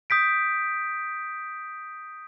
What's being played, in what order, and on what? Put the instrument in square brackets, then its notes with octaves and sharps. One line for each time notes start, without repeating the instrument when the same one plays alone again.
[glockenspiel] D#6 G6 B6 D7